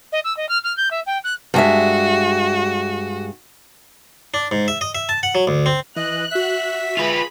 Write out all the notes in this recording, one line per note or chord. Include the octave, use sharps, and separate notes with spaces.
D#5
E6
D#5
F6
F6
G6
E5
G5
F#6
G2 G#3 F#4 E5
D4
G#2
E5
D#5
E5
A5
F#5
F#3
D2
C4
E3 D#5 F#6
F#4 E5 B6
F4 G#4 B4 B5